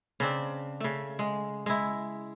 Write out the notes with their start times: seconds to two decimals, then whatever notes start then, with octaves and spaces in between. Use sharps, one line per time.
0.20 C#3 C4 D4
0.80 C#3 A3
1.19 G#3
1.66 G#3 E4